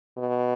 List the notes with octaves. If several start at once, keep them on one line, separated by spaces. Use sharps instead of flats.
B2